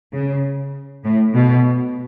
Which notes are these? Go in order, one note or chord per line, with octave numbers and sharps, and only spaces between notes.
C#3
A2
B2